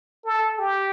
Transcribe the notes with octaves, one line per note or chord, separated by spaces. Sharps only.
A4
G4